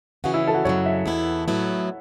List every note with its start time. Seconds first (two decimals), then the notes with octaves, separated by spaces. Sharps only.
0.24 C#3 E3 C#4 F#4
0.34 E4
0.47 A4
0.54 F#4
0.65 F#2 C#3 F#3 C#5
0.86 E5
1.06 E2 E3 B3 E4
1.48 A2 F#3 B3 E4